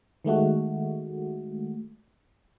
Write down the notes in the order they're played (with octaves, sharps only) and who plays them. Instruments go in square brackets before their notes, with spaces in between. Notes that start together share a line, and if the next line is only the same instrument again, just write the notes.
[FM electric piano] D#3 G#3 A3 F#4